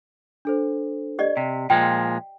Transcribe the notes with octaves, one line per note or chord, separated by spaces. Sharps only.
D4 A4 C5
G4 D5 D#5
C3 B6
A#2 F3 G#3 G5